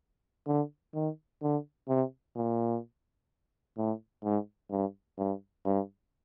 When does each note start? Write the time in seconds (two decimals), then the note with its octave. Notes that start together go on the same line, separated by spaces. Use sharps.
0.47 D3
0.94 D#3
1.42 D3
1.89 C3
2.36 A#2
3.78 A2
4.24 G#2
4.71 G2
5.18 G2
5.65 G2